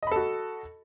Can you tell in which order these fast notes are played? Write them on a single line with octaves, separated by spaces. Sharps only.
D#5 B5 A4 F#4